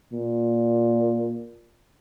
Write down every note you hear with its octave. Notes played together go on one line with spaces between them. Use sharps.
A#2